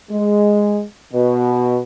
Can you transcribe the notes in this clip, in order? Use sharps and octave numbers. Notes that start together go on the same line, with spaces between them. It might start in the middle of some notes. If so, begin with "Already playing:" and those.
G#3
B2